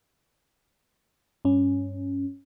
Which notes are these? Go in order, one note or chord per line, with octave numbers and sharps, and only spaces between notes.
G2 C#4